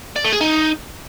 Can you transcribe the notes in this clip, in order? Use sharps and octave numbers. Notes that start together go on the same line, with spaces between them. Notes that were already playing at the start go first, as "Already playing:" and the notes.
D5
A3
G#4
D#4